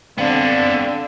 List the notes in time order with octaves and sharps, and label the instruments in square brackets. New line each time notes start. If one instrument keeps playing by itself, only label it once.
[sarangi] D3 [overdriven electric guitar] B3 D4 [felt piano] C4 [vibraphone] F5